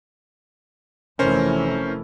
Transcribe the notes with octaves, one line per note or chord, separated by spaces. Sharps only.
F1 E3 A3 C#4 A#4 C5